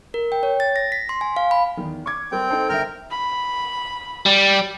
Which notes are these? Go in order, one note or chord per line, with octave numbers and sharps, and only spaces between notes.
A#4
G5
C#5
A6
A#6
B6
C6
G#5
F5
B5
E2 D#3
C#6 D6 G#6
G3 C4 A#4 G5
D#4 A4 C5
G1 A#4 E5 G5 F6
B5
G3